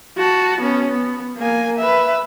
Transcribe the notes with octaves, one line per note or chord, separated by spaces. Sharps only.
F#4 A5
B3 C#4
B3
A#3 G#5
B4 E5